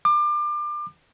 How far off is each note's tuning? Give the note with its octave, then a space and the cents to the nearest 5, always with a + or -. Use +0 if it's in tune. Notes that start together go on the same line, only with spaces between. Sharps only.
D6 +30